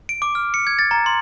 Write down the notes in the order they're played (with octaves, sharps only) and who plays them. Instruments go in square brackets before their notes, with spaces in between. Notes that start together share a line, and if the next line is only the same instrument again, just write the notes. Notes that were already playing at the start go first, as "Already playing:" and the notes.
[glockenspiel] D7
D6
F6
C#7
G#6
A6
A#5
C6